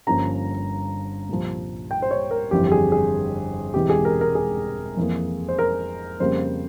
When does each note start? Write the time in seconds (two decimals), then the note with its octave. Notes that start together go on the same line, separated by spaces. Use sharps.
0.07 G1 G2 F3 A#3 C#4 A#5
1.29 C2 A#2 F3
1.91 G5
2.02 C5
2.11 C#5
2.31 A#4
2.51 G1 F2 E3 G4
2.68 G4
2.72 G#4
2.92 G#4
3.74 E1 E2 C3 E3 G#3 G4
3.90 G#4
4.05 A#4
4.21 A#4
4.35 G#4
4.97 F2 E3 A#3
5.49 C5
5.59 A#4
6.20 F2 C#3 G3 A#3 C#4 C5